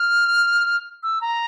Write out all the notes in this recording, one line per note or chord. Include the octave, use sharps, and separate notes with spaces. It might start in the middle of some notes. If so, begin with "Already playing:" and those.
Already playing: F6
E6
A#5